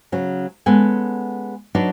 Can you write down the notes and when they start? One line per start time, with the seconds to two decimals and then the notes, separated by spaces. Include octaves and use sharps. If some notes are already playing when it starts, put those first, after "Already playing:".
0.12 C#3 F#3 C#4
0.66 G#3 B3 C#4 A4 F#5 G#5
1.75 F#3 D4 D#4 B4 C#5 D5